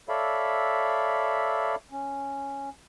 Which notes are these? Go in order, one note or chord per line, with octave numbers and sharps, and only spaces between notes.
A4 C#5 D5 E5 F5 B5
C#4